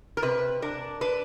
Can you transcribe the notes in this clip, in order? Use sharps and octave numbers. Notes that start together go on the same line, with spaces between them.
A#4
C3 B4
D4 A#4
D4 B4